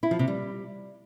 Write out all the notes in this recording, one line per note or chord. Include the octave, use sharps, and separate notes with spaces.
E4
F3
C3
G3